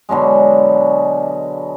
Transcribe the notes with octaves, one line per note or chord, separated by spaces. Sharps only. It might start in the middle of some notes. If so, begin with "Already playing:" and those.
B2 D3 F#3 G#3